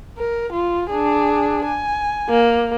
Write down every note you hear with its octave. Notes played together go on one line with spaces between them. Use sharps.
A#4
F4
D4 G#4
G#5
A#3